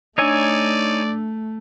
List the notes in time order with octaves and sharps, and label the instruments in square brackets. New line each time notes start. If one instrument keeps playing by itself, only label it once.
[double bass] A3 [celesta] D4 E6 [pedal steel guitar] D#4 C#5 G#5 [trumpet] D5